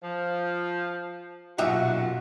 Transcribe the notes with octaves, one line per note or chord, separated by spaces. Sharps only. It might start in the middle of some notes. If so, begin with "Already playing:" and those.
F3
B1 F#2 A#2 D#4 F#4 G4 E5